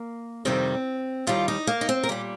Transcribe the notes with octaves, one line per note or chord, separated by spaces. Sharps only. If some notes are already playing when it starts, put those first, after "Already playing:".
Already playing: A#3
F2 C3 D#3 G3 C4
D#2 D#3 G3 F4
D#4
A#3
D#4
C4
A#4
A#2 G3 G4